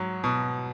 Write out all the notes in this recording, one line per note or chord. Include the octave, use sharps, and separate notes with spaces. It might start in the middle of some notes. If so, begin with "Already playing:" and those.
Already playing: G#2 F#3
B2